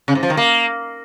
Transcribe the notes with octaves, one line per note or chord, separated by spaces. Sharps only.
C#3
G#2
F3
D#3
A#3